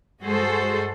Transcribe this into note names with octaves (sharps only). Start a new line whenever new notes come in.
G2 G#3 F#4 G#4 A4 C5